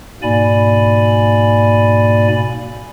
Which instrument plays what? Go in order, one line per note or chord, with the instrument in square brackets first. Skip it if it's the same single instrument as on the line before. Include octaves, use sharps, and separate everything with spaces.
[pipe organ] G#2 B2 A#3 D5 G#5 B5